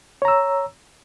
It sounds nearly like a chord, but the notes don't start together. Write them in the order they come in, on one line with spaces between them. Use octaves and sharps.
C#5 A#5 E6